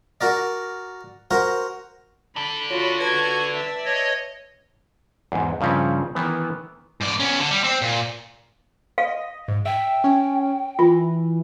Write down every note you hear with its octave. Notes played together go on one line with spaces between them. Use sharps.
F#4 A#4 D5
F#4 A#4 C5
D4 A4 B5
F4 F#4 C#5 B5
B4 A5 G#6
D5 E5
C#5 D#5
E2 G#2
G2 C#3 F3 C4 C#4
D#3 E3 B3
G#2 D5
B3 C#4
D3
G3
C4
A#2
D#5 F5
G#2
E5 G5
C#4
E3 F4